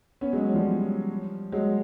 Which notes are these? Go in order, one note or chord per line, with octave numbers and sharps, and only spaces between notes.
B3 C#4
F#3 G#3
F#3
F3 G3
F#3 G#3